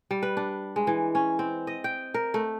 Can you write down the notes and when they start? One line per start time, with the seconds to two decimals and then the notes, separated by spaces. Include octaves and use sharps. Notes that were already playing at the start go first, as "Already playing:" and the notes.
0.11 G3
0.22 B4
0.37 D4
0.76 G#3
0.87 E3
1.15 C#4
1.39 C4
1.67 D#5
1.84 G5
2.14 A#4
2.34 A3